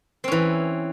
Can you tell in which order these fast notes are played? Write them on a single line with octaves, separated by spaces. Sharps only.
C4 C#4 E3